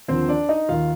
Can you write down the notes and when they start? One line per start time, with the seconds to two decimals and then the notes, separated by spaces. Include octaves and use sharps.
0.08 D#2 D3 F3 C4 C5
0.28 D4 D5
0.49 D#4 D#5
0.68 D#2 D#3 F4 F5